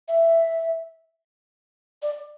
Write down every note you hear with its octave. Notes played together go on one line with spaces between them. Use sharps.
E5
D5